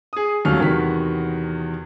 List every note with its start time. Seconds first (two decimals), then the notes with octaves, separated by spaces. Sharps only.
0.13 G#4 D#6
0.45 D#2 F#3 G3 A3 C#4 F6
0.60 E2 C3 D#3 F#4 A#4 B6